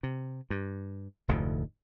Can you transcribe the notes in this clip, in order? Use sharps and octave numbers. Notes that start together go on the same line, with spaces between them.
C3
G2
F1 D2 G#2 D3